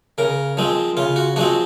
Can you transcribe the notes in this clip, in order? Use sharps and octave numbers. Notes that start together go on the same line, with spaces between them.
C#3 A#4
F3 G#3 C4
C#3 F4
F#4
F3 G#3 C4 F#4